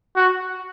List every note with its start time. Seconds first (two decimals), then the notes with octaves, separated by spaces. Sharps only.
0.16 F#4